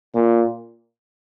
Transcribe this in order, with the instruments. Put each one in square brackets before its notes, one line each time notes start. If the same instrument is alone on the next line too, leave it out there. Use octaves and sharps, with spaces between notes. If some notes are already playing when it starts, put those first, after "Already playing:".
[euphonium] A#2